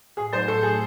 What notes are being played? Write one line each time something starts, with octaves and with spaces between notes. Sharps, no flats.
A2 G#4
F#3 A3 D#4 C5
A2 A4
F#3 A3 D#4 G#4